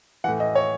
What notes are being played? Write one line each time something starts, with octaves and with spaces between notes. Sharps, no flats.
A2 E3 F#5
D#5
C#5